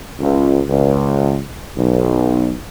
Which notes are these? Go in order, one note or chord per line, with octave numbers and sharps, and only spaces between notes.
C#2
C#2
B1